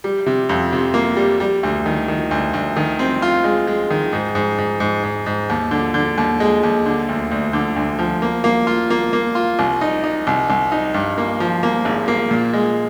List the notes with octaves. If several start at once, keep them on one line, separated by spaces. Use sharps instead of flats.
G3
C3
F2
C3
A#3
G3
G3
D2
D#3
D#3
D2
D2
D#3
C4
F4
G#3
G#3
D#3
G#2
G#2
G#2
G#2
G#2
G#2
D#2
D3
D3
D#2
G#3
D#2
D3
D2
D2
D3
D2
F3
A#3
A#3
F4
A#3
A#3
F4
C2
D#4
D#4
C2
C2
D#4
G2
A#3
F3
A#3
G#1
A#3
A#2
G#3